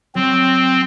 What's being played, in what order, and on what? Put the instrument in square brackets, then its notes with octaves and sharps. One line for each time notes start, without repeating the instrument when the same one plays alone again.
[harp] F#3 [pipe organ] C4